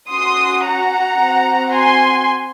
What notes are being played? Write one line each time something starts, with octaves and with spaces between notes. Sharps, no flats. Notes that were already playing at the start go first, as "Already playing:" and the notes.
C#4 F#4 C6 D#6
F#5 A#5
C4 F#4
G#5 C6